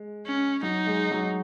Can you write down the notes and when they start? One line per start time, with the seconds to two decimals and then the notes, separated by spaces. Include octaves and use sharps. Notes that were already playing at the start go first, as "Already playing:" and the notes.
Already playing: G#3
0.26 C#4
0.63 F#3 D#4
0.86 G#3
1.11 F#3